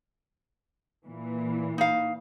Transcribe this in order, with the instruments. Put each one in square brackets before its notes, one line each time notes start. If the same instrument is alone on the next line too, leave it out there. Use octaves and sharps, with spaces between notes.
[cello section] A#2 E3
[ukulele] D#4 F5